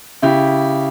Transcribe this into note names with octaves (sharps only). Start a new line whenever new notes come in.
C#3 E4 G4